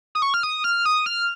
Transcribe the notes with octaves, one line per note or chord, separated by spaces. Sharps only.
D#6
C#6
F6
D#6
F6
D#6
F6